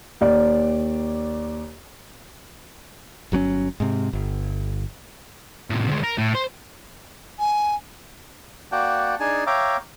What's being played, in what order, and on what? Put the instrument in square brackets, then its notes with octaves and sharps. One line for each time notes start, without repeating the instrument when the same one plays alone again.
[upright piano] D#2 D5
[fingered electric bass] G1 F#3 C4 C#4
G#2 C3
G1
[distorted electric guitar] A2 C3
D2 G#3
A#4
A2
C5
[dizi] G#5
[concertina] A#3 F#4 D5 F#5 G5 A5
D4 D#4 G#4 G#5 A5
C#5 E5 F5 G5 A#5 D6